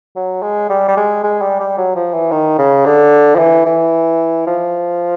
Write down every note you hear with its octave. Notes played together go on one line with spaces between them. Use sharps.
F#3
G#3
G3
G3
G#3
G#3
G3
G3
F#3
F3
E3
D#3
C#3
D3
F3
E3
E3
F3